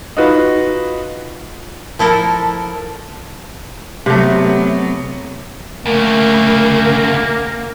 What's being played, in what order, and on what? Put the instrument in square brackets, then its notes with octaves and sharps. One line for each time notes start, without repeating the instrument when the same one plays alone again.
[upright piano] D#4 F4 F#4 B4
[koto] F3 E4 A4 A#4
[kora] C3 A3 [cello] F#3 B3
[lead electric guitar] D2 C#3 [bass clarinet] A3 [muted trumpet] A#3 [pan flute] A#4